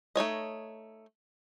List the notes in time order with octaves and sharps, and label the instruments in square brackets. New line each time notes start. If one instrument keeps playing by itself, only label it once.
[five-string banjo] A3 D#4 C#5 D#5